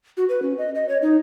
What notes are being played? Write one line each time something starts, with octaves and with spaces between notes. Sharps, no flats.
F#4
B4
C#4
D#5
D#5
C#5
D#4